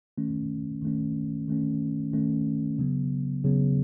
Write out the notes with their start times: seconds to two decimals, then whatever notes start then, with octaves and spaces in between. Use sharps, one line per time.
0.18 D#3 A3 C#4
0.82 D#3 A3 C#4
1.48 D#3 A3 C#4
2.13 D#3 A3 C#4
2.79 C#3 F#3 B3
3.45 C#3 F#3 B3